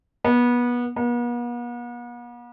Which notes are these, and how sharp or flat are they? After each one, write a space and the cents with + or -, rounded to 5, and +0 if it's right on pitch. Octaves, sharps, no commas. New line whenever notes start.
B3 -25
B3 -45